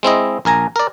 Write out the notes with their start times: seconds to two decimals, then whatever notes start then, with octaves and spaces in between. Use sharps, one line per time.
0.03 G#3 C4 E4 D#5
0.45 A#1 A#4 G#5 A#5
0.76 A#4 D5